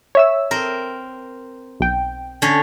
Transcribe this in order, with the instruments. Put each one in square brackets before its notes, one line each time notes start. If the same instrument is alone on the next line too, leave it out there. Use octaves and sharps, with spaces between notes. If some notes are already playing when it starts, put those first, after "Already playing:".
[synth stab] C#5 E5 E6
[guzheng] C4 A#4
[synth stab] B1 G5
[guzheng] D3 C#4